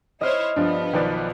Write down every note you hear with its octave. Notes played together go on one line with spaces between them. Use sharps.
E4 C5 C#5 D#5 F6
G2 F3 B3 D4
B1 D#3 F3 B4 D5